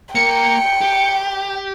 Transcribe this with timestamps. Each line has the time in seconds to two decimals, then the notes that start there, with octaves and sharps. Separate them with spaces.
0.15 A#3 A#4 G5 C#7
0.81 G4